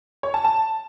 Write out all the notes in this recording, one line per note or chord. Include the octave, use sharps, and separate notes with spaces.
C#5
A5
A5